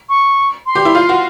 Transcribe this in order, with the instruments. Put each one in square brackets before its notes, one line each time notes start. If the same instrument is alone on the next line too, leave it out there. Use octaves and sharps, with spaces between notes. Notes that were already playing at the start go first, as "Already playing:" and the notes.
[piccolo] C#6
C6
[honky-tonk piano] G4
E4
F4
F#4